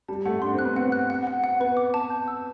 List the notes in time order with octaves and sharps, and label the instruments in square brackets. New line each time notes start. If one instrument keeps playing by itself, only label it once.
[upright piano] G3 [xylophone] A5
[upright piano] A3 [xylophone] F#5
[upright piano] D4 [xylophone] C6
[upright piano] C4
[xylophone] F#6
[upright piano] B3
[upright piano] C4 [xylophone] F#5
[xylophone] F#6
F#5
F#5
F#5
[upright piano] B3 [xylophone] B4
[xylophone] D6
A5
G6
E6